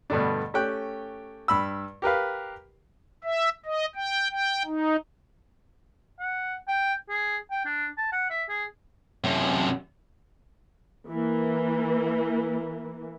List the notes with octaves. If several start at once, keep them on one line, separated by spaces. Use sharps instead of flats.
G2 B2 D3 A3 D4
A3 C#4 G4 G5 F#6
G2 B5 E6
G4 A#4 B4 F5
E5
D#5
G5
G5
D#4
F#5
G5
G#4
G5
D4
A5
F#5
E5
G#4
F#2 C3
E3 A#3